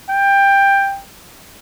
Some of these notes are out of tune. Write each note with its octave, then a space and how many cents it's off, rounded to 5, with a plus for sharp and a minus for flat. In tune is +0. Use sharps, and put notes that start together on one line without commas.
G5 +15